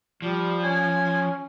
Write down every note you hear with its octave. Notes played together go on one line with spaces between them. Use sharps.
F3 G3
C#4 G#5